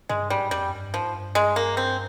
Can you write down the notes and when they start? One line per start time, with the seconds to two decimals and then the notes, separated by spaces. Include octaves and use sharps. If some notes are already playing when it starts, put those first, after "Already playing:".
0.09 G2 G#3
0.30 G#2 G3
0.51 F2 G3
0.73 G2
0.94 G#2 F3
1.14 G2
1.35 G#3
1.56 A#3
1.77 C4